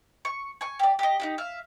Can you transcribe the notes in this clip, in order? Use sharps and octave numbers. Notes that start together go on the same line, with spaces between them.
C#6
G#5 C#6
G4 D5
G4 D#5
D#4 E4 G4
E5 F5